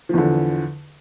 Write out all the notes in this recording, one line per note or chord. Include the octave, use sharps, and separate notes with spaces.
E2 D3 F3